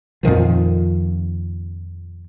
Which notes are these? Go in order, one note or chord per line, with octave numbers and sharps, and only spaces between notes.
F2 A#2 D#3 F3